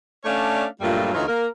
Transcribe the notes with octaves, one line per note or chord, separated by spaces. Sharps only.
A3 C#4 D4 C#5 D5 F5
G2 A#2 F#3 G3 A3 F4
D2 E3 D#4 F4 C#5
A#3 A#4